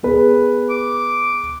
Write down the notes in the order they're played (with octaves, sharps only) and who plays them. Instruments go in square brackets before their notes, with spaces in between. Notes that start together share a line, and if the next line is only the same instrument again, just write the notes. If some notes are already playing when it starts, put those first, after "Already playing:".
[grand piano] B3 G#4 B4
[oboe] D6